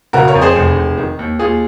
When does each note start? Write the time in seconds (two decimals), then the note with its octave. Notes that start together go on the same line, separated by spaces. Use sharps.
0.13 C#3 F#4 A#4
0.28 A#4 C#5
0.35 F2
0.41 G#4 C5
0.56 F1
0.76 F1
0.97 D#3
1.19 D#2
1.39 D#2 F4 G#4